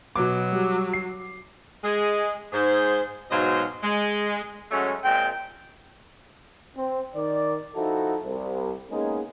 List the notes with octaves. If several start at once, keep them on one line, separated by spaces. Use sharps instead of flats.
B2 F#3 B3 D6
G3
C7
G#3 G#4
G#2 G#4 C5
G#2 B2 F#3 C5 D#5 F5
G#3
F#3 G#3 A3 C#4 F#4 C#5
A#2 G#3 C4 G5
C4
D#3 D5
F3 D#4 E4 F#4 A4
C2
G#3 A#3 B3 C#4 D#4 G#4